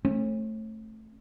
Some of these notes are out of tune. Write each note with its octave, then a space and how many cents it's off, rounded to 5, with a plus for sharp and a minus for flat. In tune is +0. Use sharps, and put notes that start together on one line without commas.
A3 +0 C#4 -45